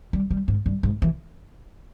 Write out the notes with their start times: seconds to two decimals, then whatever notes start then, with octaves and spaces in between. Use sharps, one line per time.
0.13 G3
0.30 G3
0.48 G#2
0.66 G2
0.83 G#2
1.02 E3